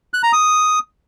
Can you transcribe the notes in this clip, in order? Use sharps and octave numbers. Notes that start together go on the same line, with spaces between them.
F#6
A#5
D#6